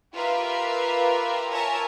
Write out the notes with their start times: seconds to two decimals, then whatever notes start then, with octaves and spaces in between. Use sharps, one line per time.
0.15 F4 G4 A#4 B4 E5
1.50 A#4 C#5 E5 G#5 A5